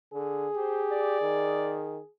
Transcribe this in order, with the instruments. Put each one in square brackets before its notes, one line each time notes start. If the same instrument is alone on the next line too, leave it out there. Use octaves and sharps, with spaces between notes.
[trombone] D3 [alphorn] G#4
[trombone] G4 [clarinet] C5
[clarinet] D5
[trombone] D#3